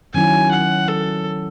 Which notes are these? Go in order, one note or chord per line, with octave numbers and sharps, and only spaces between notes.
D#3 F#3 C#4 E4 G#5
F#5
A4